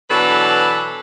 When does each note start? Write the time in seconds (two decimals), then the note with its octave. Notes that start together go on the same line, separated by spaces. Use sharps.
0.10 B2 E3 F#3 D4 A4 B4